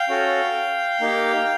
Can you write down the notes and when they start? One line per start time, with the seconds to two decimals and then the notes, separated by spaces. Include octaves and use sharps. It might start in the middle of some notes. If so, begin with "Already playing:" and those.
Already playing: F5 G5
0.09 C#4 F#4 A4
1.00 A#3 D#4 G4